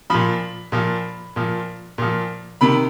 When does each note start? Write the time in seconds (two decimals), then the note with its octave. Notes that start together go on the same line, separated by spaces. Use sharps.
0.10 A#2 F3 B5
0.72 A#2 F3
1.36 A#2 F3
1.98 A#2 F3
2.61 C3 D#3 B5